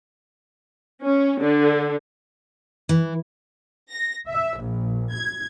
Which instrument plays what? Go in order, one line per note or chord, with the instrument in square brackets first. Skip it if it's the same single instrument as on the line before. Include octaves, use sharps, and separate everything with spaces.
[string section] C#4
D3
[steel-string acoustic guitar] E3
[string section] A#6
E5
A#1
G#6